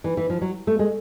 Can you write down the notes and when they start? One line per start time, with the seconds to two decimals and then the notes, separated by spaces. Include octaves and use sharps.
0.04 E3
0.17 E3
0.30 F3
0.41 F#3
0.67 A3
0.79 G#3